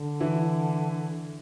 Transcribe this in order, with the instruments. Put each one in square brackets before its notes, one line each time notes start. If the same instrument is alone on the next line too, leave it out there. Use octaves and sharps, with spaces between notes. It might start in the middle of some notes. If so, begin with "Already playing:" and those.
Already playing: [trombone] D3
[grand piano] E3 E4